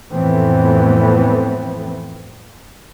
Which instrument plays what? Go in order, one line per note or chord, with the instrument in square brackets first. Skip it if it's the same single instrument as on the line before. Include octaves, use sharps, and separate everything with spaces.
[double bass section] F2 A2 E3 A3 B3 C4